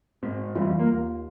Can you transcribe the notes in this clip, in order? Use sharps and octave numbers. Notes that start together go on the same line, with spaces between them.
G#2 C4
F2 E3 G3 F4
A#3
D#2